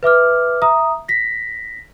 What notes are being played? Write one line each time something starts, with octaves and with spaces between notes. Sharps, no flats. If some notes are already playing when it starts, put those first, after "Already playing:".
B4 E5 D6 F6
E5 A#5 D#6
A#6 B6